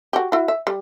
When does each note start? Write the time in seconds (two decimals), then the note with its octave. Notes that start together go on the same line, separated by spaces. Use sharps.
0.13 F#4 G4
0.32 E4 F#4
0.48 E5
0.67 G3